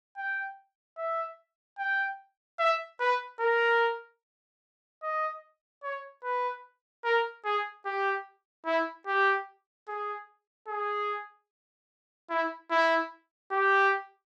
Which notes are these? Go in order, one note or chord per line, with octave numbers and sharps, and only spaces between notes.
G5
E5
G5
E5
B4
A#4
D#5
C#5
B4
A#4
G#4
G4
E4
G4
G#4
G#4
E4
E4
G4